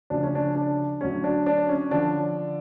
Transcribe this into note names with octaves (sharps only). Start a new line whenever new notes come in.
D2 C#3 F3 D4
C#4
D4
D4
D2 D3 F#3 C#4
D4
D4
C#4
D3 F3 D4